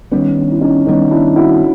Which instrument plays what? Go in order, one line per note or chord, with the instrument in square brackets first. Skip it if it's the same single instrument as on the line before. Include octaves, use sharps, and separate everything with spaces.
[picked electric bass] D#3 G3 B3 [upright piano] C#4 D#4
[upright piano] D4
E4
C#4 D#4
[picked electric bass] D#3 G3 B3 [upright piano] C#4 D#4
[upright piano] D4 E4
E4 F#4